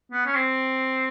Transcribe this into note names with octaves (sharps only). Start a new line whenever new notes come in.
B3
C#4
C4